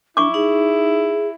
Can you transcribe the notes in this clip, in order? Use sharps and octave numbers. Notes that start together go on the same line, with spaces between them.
D4 E4 C#6 D6
D#4 G#4